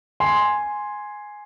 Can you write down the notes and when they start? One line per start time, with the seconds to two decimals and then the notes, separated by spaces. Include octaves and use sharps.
0.20 G#5 C6